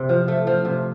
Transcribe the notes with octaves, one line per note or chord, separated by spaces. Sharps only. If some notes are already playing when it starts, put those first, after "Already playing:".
Already playing: C3 C4
F3
A3
F3
C3